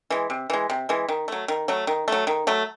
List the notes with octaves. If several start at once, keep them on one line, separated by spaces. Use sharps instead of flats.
E3 G#3
C3
E3 G#3
C3
E3 G#3
D#3
F#3 A3
D#3
F#3 A3
D#3
F#3 A3
D#3
F#3 A3